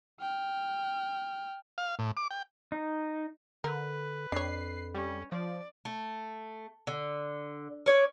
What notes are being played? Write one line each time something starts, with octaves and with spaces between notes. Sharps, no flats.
G5 F6
F5
A2
D6
G5
D#4
D3 A#4 B4
F2 D4 C#5 C7
G3 C#4
F3 D5
A3
D3
C#4 C#5 D5